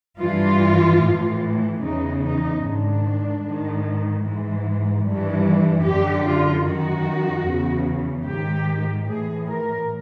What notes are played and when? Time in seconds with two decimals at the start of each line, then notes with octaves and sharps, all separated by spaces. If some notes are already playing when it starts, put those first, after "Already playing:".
0.18 G2 E3 F4
0.99 A2 E3
1.80 E2 C#3 E3 D#4
2.20 D#4
2.61 G#2 D#3 D4
3.42 G#2 D#3
4.22 G#2 E3
5.04 G2 E3
5.84 F#2 D3 G4
6.24 F4
6.65 F#2 D#3 F#4
7.46 E2 C#3 E3
8.26 G#2 D#3 G4
9.07 A2 E3 G#4
9.47 A#4